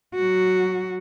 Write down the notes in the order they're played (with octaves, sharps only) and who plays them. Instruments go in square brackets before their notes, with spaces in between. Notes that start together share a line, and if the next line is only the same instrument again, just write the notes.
[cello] F#3 F#4